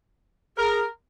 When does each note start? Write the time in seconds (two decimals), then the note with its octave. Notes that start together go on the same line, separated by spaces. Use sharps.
0.58 G#4 A#4